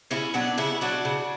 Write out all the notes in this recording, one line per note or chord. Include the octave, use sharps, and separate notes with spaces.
C#3 C#4 E4
F#3 B3 D4
C#3 C#4 E4
F#3 D4 F#4
C#3